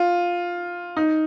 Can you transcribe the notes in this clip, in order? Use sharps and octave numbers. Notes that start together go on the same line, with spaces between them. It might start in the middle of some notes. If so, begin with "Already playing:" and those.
Already playing: F4
D#4